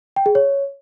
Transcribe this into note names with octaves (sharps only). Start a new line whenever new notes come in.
G5
G#4
C#5